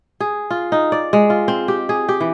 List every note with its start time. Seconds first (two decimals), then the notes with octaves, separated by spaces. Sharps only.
0.20 G#4
0.50 F4
0.72 D#4
0.92 D5
1.13 G#3
1.30 F4
1.48 C4
1.68 G4
1.89 G#4
2.09 G4
2.20 E3